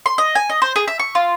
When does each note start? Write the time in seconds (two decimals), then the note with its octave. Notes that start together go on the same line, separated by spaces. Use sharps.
0.06 C6
0.18 D#5
0.35 G#5
0.50 D#5
0.62 C5
0.76 G#4
0.88 E5
1.00 C#6
1.15 F4